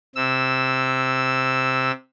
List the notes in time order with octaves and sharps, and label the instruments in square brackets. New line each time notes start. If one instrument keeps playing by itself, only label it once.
[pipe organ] C3 E6